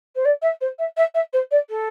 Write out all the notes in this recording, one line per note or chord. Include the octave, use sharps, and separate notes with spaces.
C5
D5
E5
C5
E5
E5
E5
C5
D5
A4